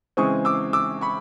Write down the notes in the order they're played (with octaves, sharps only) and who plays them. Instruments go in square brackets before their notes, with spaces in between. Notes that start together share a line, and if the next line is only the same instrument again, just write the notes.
[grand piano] C#3 E3 G#3 C4 C#6 D#6
D6 E6
D6 E6
B5 C#6